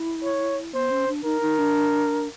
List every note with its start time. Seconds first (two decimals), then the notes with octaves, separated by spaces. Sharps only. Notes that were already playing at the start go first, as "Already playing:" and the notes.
Already playing: E4
0.23 C#5
0.74 B3 C5
0.91 C#4
1.08 D4
1.24 D#4 A#4
1.41 D#4
1.58 D4